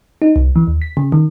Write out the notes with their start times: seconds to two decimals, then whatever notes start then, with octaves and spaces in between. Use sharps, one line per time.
0.22 D#4
0.36 C2
0.56 E3
0.67 D#2
0.82 B6
0.97 C#3
1.12 D#3